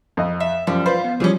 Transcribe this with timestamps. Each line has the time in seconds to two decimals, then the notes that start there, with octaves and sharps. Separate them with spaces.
0.17 F2 D#5
0.40 E5
0.67 F#2 F3 G3
0.86 F4 B4 C5 B5
1.04 B3
1.20 E3 F3 G3 C#4 G#4